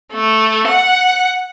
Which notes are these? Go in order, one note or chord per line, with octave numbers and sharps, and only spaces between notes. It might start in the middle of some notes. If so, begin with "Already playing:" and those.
A3
F#5